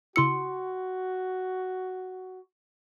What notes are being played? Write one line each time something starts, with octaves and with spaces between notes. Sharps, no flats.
C#3 E4 F#4 C6 E6 C#7